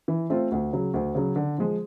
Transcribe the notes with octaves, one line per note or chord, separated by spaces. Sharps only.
E3
A3 C4 F4
D2
C#3 F#3
D2
C#3 F#3
D3
F3 G#3